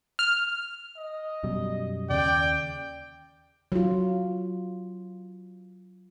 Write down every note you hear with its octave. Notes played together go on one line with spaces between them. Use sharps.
F6
D#5
F#2 B2 G3
D#2 C#3 D5 G5
F#3 F4